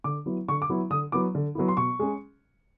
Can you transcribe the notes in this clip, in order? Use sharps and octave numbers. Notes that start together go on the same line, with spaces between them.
D3 D6
F#3 B3 E4
D3 C#6
D6
F#3 B3 E4
D3 D#6
F#3 B3 E4 D6
D3
F#3 B3 E4
C6
B2 C#6
G#3 C#4